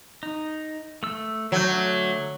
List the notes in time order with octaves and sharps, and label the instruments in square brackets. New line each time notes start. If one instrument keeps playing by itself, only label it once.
[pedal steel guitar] D#4
A3 E6
[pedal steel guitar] D3 A3 G6 [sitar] F#3